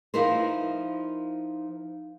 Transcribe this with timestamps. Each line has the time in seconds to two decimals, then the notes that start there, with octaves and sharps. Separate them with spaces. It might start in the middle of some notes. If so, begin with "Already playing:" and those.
0.14 F3 D#4 E4 A#4 C5